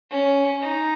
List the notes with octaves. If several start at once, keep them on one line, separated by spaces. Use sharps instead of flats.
C#4
D#4